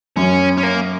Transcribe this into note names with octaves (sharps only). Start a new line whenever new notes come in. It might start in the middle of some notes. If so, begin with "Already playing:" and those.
F#2 C#4
C#4
A#3